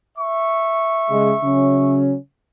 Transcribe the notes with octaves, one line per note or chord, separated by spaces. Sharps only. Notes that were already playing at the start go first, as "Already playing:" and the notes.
E5 C#6
C#3 G#3
C#3 F#3 C#4